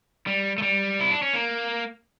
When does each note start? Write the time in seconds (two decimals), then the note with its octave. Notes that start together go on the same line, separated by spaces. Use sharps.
0.27 G3
0.58 A3
0.62 G3
1.00 E4
1.11 D4
1.22 C#4
1.33 A#3